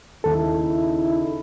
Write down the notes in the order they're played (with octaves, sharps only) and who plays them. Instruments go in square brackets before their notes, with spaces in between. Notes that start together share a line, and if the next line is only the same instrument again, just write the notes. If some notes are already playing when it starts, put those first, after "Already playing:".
[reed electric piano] D#2 A4 [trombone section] C#3 D#4 E4